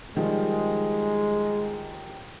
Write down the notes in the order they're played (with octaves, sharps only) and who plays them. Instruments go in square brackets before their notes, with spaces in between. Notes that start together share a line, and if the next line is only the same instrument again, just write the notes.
[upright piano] D#3 F3 G3 [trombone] G#3